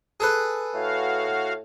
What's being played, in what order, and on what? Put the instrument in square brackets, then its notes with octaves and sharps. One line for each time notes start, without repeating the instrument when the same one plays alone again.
[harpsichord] G#4 A4 B4
[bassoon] A2 [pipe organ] F#4 F5